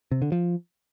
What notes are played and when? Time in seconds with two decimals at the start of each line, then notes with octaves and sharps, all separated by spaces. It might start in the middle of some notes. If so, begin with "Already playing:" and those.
0.12 C3
0.22 D3
0.32 F3